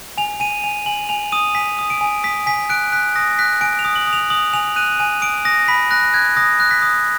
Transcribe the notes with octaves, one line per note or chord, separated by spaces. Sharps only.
G#5 F7
G#5 D#7
G#5 F7
G#5 F#7
G#5 F7
D#6 D#7
G#5 B6
D#6
D7
G#5
D#6 B6
G#5 B6
F#6 D7
F#6 B6
D#6 A#6
F#6 B6
G#5 D7
F7
D#6
F#7
D#6
F7
D#6 F#7
G#5 F7
F#6 D#7
G#5 D#7
D#6 D7
D#6 A#6
B5 B6
F#6 A#6
F#6 G#6
D#6 A#6
F#6
B6
D#6